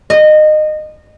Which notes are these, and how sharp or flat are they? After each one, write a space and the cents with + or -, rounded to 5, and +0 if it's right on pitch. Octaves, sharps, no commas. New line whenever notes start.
D#5 -20